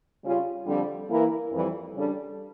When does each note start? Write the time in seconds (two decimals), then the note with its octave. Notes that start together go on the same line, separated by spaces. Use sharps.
0.24 C#3 G3 C#4 F4
0.67 F2 D3 G3
1.10 E3 A#3 E4 A#4
1.52 F2 E3 G3
1.95 C#3 G3 D4 A4